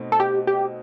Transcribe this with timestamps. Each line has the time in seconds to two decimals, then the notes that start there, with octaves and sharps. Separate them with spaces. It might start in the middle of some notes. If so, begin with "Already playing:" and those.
Already playing: B2 A3 C4 D#4
0.12 A4
0.20 G4
0.47 G4